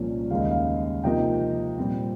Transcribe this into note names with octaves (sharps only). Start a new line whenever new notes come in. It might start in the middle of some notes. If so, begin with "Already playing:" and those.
Already playing: C2 A#2 F3 A#3 C#4
D#2 C#3 G#3 D#4 F5
D#5
F5
C3 F3 A#3 D#4 D#5 G5
A#2 G3 C4